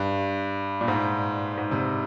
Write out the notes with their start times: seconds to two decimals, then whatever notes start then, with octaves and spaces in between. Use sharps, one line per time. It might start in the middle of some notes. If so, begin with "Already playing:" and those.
Already playing: G2
0.81 A#2
0.88 G#2
1.57 G#2
1.71 C3